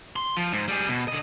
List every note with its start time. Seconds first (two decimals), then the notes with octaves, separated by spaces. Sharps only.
0.16 C6
0.37 F3
0.52 G#2
0.68 G3 G#4
0.89 B2
1.08 D3 D#5